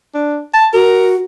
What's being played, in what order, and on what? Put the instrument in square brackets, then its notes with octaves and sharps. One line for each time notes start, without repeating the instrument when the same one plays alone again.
[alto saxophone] D4
A5
[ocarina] F#4 [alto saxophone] A#4